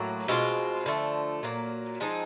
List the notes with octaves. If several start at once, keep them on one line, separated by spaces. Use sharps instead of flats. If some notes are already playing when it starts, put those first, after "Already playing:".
Already playing: A2 F#3 A#3
B2 G#3 C4 F4
D3 F3 A3
A#2 F#3 A#3
F3 G#3 C4 D#4